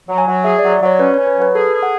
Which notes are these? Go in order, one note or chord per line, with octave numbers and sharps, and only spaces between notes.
F#3
G#5
F#3
G#4 E5
D5
F#3
D5
F#3 C#5
C#4 B4
C#5
C#4
B4
F#3 B4
G#4 A4
G#4
F#5